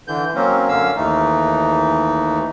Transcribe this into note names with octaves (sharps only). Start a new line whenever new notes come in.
D3 E3 G6
F#3 A#3 C4 C#4
F#2 D3 C#4 F5 E6
D#2 E3 A3 D#4